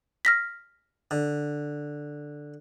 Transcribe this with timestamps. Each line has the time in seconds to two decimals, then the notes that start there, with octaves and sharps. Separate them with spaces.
0.25 F6 A#6 B6
1.11 D3